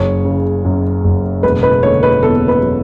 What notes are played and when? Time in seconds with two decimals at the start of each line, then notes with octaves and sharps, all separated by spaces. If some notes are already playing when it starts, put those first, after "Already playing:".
Already playing: F#1 C#5
0.25 C#3
0.65 F#2
1.04 F#1
1.43 E1 B4
1.63 B4
1.83 D3 C#5
2.03 B4
2.22 E2 A4
2.48 B4
2.62 F#3